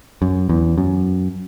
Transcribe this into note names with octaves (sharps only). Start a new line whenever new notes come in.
F#2
E2
F#2